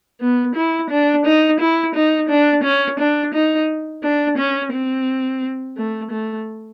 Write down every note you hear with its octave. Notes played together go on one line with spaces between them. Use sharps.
B3
E4
D4
D#4
E4
D#4
D4
C#4
D4
D#4
D4
C#4
C4
A3
A3